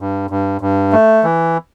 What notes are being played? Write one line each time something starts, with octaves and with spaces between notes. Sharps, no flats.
G2
G2
G2
A3
E3